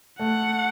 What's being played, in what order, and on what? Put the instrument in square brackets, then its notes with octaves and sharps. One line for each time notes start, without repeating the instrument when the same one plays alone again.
[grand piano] A3 [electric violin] F#5